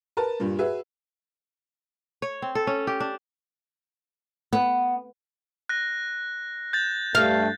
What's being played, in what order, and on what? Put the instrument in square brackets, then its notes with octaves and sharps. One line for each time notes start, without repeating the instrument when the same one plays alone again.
[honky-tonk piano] A#4 B4 A5
G2 A#2 G3
F#4 G#4 B4 E5
[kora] C#5
C4
A4
C#4
G4
D4
[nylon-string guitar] B3
[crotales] F#6 A#6
G6 A6
[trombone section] G2 A3 [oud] F5